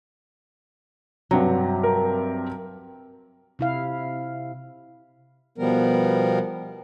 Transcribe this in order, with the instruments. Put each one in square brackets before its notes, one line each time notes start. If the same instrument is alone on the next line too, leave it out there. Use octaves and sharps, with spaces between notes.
[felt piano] G2 C3 A#5 [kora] F#3
[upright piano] A#4
[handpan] C3 E4 F5
[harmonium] B2 F3 G3 B3 A#4